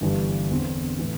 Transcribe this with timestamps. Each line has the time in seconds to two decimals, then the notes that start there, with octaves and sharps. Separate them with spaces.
0.01 G1 G2 E3 G3
0.51 E2 D3 C4
0.99 A2 E3